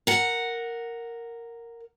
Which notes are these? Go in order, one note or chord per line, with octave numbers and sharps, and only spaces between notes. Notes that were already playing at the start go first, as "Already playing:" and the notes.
A#4 F#5